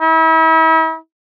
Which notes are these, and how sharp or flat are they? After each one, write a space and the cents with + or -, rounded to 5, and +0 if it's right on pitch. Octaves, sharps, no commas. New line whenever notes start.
E4 -40